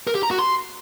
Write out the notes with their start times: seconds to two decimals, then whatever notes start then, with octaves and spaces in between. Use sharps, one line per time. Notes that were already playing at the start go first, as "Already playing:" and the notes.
0.07 A#4
0.15 G4
0.23 A#5
0.31 F#4
0.39 C6